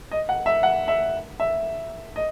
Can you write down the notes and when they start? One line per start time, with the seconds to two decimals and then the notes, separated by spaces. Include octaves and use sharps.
0.11 D#5
0.29 F#5
0.46 E5
0.63 F#5
0.88 E5
1.40 E5
2.16 D#5